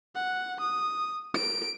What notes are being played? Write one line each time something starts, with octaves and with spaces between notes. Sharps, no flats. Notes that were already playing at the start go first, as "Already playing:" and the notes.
F#5
D#6
D7